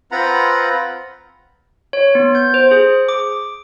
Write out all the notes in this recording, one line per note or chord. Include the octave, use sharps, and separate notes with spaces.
C4 F4 B4 F#5 A#5 B5
C#5
B3
G6
C5
G#4
D6